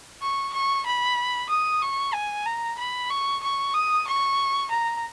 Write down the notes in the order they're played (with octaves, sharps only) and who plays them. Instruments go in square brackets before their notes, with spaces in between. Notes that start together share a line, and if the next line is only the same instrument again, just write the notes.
[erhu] C#6
C#6
B5
D#6
C#6
G#5
A#5
B5
C#6
C#6
D#6
C#6
A#5